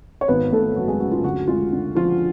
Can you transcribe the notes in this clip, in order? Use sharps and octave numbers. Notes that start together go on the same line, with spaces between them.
C#5
G#1 B3 B4
G#1 A3 A4
F#2 F#4
G#3 G#4
C#3 F#4
F4
D2 F#4
G#3 F4
D3
F3 F4